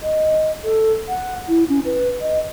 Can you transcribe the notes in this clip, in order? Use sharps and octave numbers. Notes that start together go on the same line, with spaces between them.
D#5
A4
F#5
E4
C#4
B4
D#5